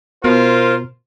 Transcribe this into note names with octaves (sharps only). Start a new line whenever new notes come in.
B2 F4 A#4 C5